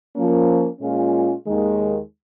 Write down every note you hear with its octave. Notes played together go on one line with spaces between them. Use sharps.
F3 A#3 C#4
A#2 G#3 C#4 F4
D#2 D#3 G#3